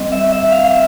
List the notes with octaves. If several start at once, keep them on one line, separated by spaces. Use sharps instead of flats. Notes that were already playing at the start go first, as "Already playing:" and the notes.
Already playing: G3 C4 D#5
E5
E5
F5
F5
E5